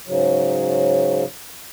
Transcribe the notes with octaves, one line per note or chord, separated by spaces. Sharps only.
G#2 C#3 F#3